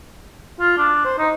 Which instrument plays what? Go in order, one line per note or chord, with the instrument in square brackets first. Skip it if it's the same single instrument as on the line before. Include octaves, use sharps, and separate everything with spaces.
[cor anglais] F4
D4
C5
D#4